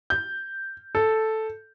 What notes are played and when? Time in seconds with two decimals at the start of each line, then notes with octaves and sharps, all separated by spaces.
0.10 G6
0.95 A4